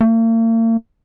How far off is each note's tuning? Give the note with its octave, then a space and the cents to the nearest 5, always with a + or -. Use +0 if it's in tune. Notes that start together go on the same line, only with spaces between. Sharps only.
A#3 -45